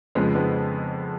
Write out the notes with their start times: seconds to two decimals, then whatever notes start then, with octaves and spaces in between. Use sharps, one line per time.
0.15 F2 C#3 F3 G#3 B3
0.35 G#3 B3